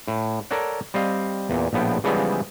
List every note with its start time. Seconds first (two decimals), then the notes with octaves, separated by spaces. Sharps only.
0.08 A2
0.51 A4 A#4 C#5 D5 F#5
0.94 G3 C4 D#5 F5
1.50 E2 A#2
1.73 A#1 A2 F3 B3 G5
2.04 C#3 E3 F3 G3 G#3 B3